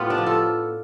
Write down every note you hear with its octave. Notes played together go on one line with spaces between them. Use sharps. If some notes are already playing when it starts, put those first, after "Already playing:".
Already playing: A2 B3 F4 G4
D4
F3
F4 A4